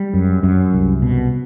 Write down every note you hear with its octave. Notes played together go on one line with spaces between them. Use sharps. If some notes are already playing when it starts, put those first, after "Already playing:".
Already playing: G3
F#2
F#2
C2
B2